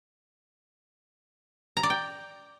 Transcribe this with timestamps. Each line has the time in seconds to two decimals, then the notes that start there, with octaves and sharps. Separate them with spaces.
1.77 A#5
1.83 D5
1.90 G5